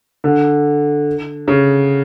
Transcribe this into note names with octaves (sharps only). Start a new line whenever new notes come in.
D3
C#3